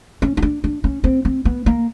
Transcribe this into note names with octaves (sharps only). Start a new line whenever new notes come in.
C#4
D#4
D4
D4
C#4
C4
C4
B3
A#3